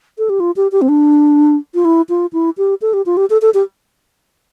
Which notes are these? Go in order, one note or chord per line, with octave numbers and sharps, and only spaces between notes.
A4
G4
F4
G4
G4
C4
D4
F4
E4
F4
E4
G4
A4
G4
F4
G4
A4
A4
G4